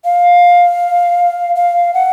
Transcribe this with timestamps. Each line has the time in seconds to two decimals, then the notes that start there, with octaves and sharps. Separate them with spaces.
0.05 F5
1.56 F5
1.94 F#5